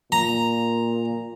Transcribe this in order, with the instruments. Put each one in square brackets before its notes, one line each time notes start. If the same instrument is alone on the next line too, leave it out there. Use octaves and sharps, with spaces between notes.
[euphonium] A#2 [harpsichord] A#5